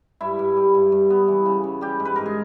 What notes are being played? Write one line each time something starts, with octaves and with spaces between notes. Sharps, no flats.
G2 E4
G2
G3
G2
G2
B3
E3
C#3
C#3
G3 G4
G#2
B4
G#2 A#4
G#4